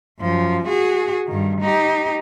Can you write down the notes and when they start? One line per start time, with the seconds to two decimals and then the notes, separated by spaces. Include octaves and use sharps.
0.20 F#2 F3
0.66 F#4 G#4
1.27 G2 D#3
1.61 D#4 G4